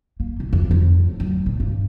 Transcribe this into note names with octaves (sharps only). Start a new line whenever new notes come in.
A#3
B1
F2
F2
A2
F#3
A#2
G2